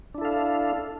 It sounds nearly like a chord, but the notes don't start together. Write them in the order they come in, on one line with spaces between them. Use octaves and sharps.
D4 E4 A4 F5